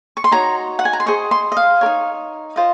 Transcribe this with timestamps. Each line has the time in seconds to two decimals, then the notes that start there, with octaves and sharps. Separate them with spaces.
0.17 C#6
0.24 C6
0.31 D#4 F#4 C#5 A#5
0.79 F#5
0.85 G#5
0.93 A#5
1.00 C6
1.06 G#4 C5 D#5 C#6
1.31 C6
1.52 D#5
1.57 F5
1.81 A#4 C#5
1.86 D#4
2.56 F4 C5 D#5